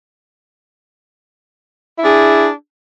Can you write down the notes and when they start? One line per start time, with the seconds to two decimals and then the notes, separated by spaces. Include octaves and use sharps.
1.99 E4
2.02 D4
2.05 G#4